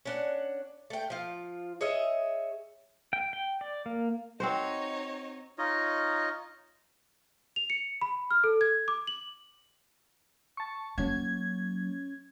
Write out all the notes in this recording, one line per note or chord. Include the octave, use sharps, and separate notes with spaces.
C#4 D4 F#5
A3 G5
F3 F4
G#4 C#5 D#5 E5
G5
G5
D5
A#3
C4 D#4 F#4 C5 C#5
D#4 F4 C#5 D#5
F7
C#7
B5
F6
A4
G#6
D6
F#7
A5 C#6
F#3 A#3 C#4 G#6